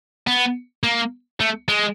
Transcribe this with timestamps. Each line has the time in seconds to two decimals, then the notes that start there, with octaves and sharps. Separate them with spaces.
0.27 B3
0.83 A#3
1.40 A3
1.68 G#3